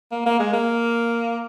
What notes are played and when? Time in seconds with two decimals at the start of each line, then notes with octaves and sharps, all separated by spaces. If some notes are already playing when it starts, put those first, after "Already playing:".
0.11 A#3
0.26 A#3
0.39 G#3
0.53 A#3